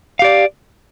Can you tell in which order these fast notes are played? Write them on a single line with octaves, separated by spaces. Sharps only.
F5 G4 D5